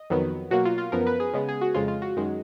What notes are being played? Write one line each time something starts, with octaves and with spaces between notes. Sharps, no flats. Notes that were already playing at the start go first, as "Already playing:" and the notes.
Already playing: D#5
F2 D#3 F#3 B3
B2 F#3 A#3 F#4
F4
F4
F#2 F3 B3 A#4
B4
G#4
C#3 G#3 B3
G#4
F#4
F2 C#3 G#3 F4
F4
F#4
F#2 D#3 G#3